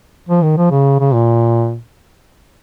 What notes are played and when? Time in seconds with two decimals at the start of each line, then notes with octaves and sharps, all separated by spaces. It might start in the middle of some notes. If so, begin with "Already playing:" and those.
0.29 F3
0.43 D#3
0.57 F3
0.70 C#3
1.00 C#3
1.14 A#2